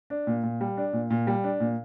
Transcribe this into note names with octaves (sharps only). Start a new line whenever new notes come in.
D4
A#2
A#2
G3
D4
A#2
A#2
G3
D4
A#2